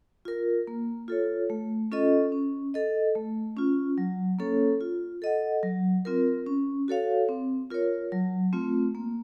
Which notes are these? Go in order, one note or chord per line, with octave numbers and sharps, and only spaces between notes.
F4 A#4
A#3
F4 A4 C#5
A3
C#4 F4 A4 D#5
C#4
A4 D#5
A3
C#4 F4
F#3
A#3 C#4 A4 C#5
F4
A4 D#5 F#5
F#3
C4 F4 A#4
C#4
F#4 A4 C#5 F5
C4
F4 A#4 C#5
F#3
A3 C4 F4
A#3